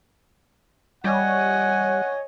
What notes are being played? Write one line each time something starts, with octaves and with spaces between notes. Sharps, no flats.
G3 C#5 D#5 F#5 G#5